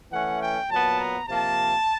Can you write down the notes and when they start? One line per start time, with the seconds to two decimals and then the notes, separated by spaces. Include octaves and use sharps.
0.11 E3 A3 C#4 F#5
0.41 G5
0.70 A#2 F#3 B3 A5
0.99 A#5
1.28 C3 F3 A#3 A5